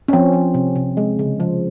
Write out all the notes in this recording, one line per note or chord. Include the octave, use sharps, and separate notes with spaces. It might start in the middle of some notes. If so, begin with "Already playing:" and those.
C#4
F3 C4
F3
C3
C3
G#3
C#3
F3